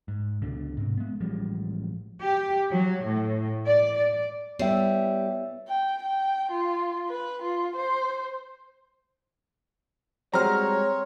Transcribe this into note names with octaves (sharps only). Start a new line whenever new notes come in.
G#2
C#2 B2 D3
G#2 C3
G#3 B3
A1 F3 G3 G#3
G4
F#3
A2
D5
D5
G3 B3 C#5 E5 G5
G5
G5
F4
B4
F4
C5
G3 G#3 C4 F#4 C#5 A#5 F6